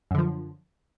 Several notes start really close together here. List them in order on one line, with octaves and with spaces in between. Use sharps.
F#2 D3 F3